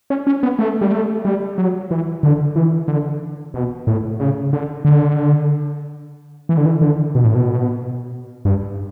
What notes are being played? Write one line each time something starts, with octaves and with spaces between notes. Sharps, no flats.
C#4
C#4
B3
A3
G3
A3
G3
F#3
E3
D3
E3
D3
B2
A2
C#3
D3
D3
E3
D3
E3
D3
B2
A2
B2
G2